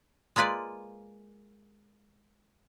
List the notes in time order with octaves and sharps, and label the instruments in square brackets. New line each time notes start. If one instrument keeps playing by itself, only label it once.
[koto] G#3 A#3 F4 B4 D5